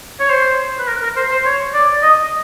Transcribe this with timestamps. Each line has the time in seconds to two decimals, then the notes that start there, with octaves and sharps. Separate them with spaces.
0.20 C#5
0.30 C5
0.79 B4
0.88 A#4
1.02 A#4
1.16 C5
1.31 C5
1.45 C#5
1.74 D5
2.03 D#5